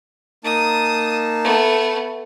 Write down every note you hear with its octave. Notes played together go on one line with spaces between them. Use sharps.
A#3 D#4 A5 D#6
A3 B3